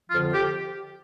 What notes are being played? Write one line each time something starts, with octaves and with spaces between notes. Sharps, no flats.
F2 D3 F3 F4
G4